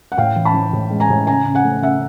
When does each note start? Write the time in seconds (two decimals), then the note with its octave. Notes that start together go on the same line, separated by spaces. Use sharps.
0.12 F#5
0.18 A2 F5 G5
0.36 E3
0.45 A5 B5
0.54 E3
0.73 A2
0.90 G#3
1.00 G#5 A#5
1.10 A2
1.27 C#3 G#5 A#5
1.46 C#3
1.55 F#5 G#5
1.65 A3
1.82 C#3 E5 F#5